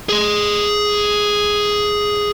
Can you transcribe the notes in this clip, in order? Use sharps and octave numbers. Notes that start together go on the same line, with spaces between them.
G#4 C6